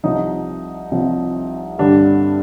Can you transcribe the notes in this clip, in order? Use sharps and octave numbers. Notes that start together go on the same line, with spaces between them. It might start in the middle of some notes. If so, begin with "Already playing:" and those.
C2 C3 F3 D#4
C2 C3 F3
G2 D3 G3 D4